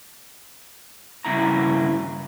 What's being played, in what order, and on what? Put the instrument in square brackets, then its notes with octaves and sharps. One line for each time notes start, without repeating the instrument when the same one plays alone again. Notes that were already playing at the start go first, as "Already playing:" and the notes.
[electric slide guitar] G2 C#3 E4 A#5